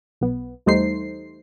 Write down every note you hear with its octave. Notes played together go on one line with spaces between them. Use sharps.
B1 B3
E2 G3 A3 D#4 C5 C7